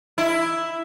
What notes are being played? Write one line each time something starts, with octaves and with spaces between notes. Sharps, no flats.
E4